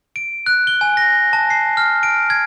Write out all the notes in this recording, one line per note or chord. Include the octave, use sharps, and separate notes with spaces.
D7
F#6
G7
G#5
A#6
A5
C7
F6
D7
G#6